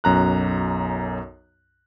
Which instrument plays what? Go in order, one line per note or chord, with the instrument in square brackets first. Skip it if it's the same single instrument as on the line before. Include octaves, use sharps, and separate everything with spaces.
[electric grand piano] B1 F#2 A#5 F#6